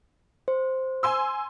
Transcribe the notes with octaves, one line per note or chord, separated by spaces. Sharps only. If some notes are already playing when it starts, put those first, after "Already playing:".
C5
G#5 C6 E6